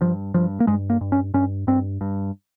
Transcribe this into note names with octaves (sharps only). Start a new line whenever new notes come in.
G2 F3
G2 F3
A#3
G2 G#3
A#3
G2
C#4
G2 C#4
G2 C4
G2